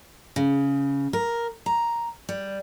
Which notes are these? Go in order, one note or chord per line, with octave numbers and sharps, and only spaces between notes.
C#3
A#4
A#5
G3